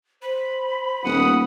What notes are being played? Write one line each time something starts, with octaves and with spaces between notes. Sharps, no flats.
C5 B5
D#1 B3 F#5 D#6